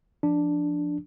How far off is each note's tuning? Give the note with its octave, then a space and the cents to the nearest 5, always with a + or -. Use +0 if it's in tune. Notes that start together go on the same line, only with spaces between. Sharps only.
F3 +0 D4 +0